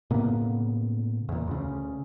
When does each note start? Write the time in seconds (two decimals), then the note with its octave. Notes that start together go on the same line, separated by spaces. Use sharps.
0.10 A2 C#3 A#3 B3
1.29 E2 A#2
1.47 D2 C#3